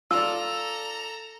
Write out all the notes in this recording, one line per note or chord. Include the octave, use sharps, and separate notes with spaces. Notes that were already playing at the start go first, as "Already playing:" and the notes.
F4 A4 D5 A#5 E6